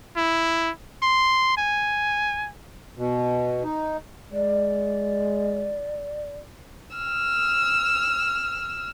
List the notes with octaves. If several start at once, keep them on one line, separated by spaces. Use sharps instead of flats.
E4
C6
G#5
B2
D#4
G#3 D5
E6 F6